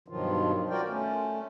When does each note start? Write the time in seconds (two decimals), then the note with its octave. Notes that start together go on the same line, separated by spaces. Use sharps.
0.08 G2 B2 D#3 F3 F#3 F4
0.70 F4 F#4 A#4 D5 G5
0.88 A3 C#4